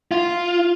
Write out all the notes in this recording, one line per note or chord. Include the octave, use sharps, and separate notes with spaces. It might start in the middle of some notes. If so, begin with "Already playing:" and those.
F4